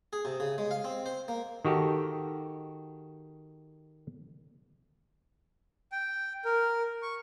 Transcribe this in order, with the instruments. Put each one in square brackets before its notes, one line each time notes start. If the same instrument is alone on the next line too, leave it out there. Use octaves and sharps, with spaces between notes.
[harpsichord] G#4
C3
C#3
G#3
F5
C4
C5
A#3
[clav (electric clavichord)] D#3 F#4 G4 A4
[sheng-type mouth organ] G5
A#4
C#6